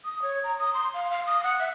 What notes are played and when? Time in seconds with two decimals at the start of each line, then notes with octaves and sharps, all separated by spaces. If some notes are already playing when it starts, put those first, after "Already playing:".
0.05 D#6
0.22 C#5
0.44 A#5
0.59 D#6
0.74 C6
0.94 F5
1.11 F5
1.27 D#6
1.43 F#5
1.60 E5